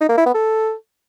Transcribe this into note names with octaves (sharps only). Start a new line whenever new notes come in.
D#4
A#3
E4
B3
A4